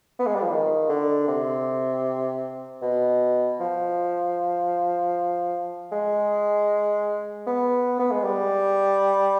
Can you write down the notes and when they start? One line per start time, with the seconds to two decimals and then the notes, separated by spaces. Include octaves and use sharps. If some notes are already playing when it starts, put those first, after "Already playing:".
0.19 B3
0.26 G#3
0.35 G3
0.42 F3
0.51 D#3
0.89 D3
1.28 C3
2.82 B2
3.60 F3
5.92 G#3
7.47 B3
7.99 B3
8.11 G#3
8.24 G3